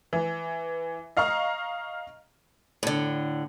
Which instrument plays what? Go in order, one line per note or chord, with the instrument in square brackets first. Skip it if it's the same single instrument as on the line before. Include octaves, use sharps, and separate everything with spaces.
[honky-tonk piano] E3
D#5 F5 A#5 C#6 F6
[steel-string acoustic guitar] A2 D3